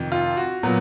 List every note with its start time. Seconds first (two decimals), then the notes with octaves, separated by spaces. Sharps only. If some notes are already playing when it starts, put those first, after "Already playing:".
Already playing: F2 C3 D#3
0.12 F4
0.37 F#4
0.63 A#2 F#3 B3